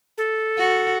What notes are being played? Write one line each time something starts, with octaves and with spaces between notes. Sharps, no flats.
A4
F#4